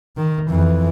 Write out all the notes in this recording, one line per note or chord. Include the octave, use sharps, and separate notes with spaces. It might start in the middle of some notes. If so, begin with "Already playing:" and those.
D#3
F2 E3